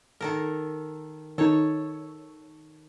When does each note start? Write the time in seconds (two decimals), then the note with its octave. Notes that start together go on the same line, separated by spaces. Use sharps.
0.21 D#3 A4 A#4
1.38 D#3 D#4 A4 C#5